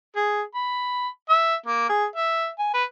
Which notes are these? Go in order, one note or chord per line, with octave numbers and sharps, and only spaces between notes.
G#4
B5
E5
A#3
G#4
E5
G#5
B4